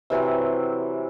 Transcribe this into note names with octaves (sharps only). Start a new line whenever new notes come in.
C3 E3 F#3 C4